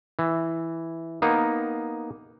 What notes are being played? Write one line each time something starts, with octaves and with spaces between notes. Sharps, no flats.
E3
A#3 B3 D#4